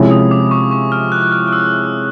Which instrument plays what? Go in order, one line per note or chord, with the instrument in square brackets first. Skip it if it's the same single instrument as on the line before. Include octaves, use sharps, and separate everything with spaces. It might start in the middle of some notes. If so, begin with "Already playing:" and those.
Already playing: [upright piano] C3 F3 G#3 C#4 E4
[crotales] D#6
D6
C#6
C#6
F6
F#6
F#6
F6
F6
E6